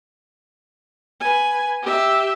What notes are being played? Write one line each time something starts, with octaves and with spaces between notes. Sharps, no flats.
B4 G#5
G4 E5